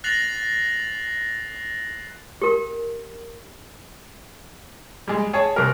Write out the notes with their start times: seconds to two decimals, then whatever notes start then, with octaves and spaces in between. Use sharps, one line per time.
0.04 F#6 A6 A#6 C7 F7 F#7
2.42 G4 A#4
5.08 G3 G#3
5.33 G#4 C#5 G#5 A5
5.56 C2 G4 A#4